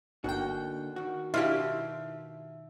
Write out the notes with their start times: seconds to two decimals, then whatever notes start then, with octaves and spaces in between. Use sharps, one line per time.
0.24 G1 D3 A#3 D#4 F#4 G5 F#6
0.96 D#3 F#4
1.34 B2 D4 E4 F4 G4 E5